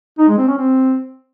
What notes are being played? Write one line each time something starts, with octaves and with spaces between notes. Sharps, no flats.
D#4
G#3
C4
C#4
C4